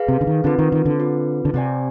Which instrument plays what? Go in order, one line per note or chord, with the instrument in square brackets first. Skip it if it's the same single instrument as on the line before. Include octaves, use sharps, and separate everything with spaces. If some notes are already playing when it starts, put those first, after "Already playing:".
Already playing: [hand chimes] G#4 B4 F5
[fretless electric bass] C3
D3
D#3
[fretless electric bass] D3 [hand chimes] C4 F4 B4
[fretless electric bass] D#3
D#3
D3
[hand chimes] C4 F4 B4
[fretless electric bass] D3
[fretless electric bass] C3 [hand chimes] C4 G4 D5 G#5